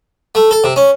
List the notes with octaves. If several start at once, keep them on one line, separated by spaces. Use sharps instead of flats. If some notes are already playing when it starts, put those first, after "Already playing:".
A3
A4
C3
C#4